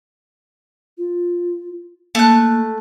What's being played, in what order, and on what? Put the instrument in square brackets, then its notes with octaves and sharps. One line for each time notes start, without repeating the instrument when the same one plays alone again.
[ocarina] F4
[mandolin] A3 F#6 [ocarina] A#3